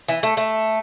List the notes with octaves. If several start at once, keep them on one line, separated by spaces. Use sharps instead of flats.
E3
A3
A3